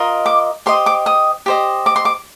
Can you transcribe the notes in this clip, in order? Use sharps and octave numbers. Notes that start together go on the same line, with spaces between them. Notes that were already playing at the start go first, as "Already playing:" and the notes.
Already playing: F4 A#4 D#5
D6
G4 C5 D#5 C6
D6
D#6
G4 C5 D#5
D6
C6
D6